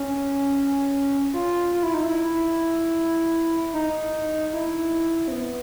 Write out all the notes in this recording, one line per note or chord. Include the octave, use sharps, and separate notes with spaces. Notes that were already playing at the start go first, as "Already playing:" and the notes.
Already playing: C#4
F4
F4
E4
D#4
E4
D#4
E4
C4
B3